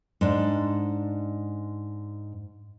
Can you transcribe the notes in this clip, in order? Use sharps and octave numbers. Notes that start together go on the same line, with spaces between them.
G#2 D4